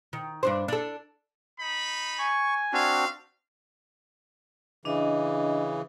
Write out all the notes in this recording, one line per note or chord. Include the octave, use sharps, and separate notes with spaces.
D#3
G2 D4 C5
D4 A4
D#4 B5
G#5 C#6
G3 C4 D4 F#4 F5
C#3 E3 D4 D#5